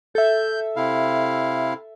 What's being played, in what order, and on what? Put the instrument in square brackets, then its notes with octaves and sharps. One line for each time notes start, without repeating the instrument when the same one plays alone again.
[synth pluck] A4 E5 [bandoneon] G6
[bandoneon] C3 E4 F5